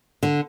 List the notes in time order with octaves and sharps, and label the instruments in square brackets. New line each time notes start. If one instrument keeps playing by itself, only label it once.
[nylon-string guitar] D3